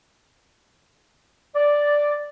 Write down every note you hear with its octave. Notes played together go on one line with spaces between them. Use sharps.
D5